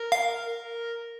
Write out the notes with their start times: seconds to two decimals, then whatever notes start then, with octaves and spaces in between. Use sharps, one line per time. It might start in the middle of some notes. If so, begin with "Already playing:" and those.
Already playing: A#4
0.12 F5
0.44 A#4